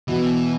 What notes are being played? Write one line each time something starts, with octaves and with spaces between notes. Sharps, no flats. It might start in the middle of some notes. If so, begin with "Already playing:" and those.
B2 E3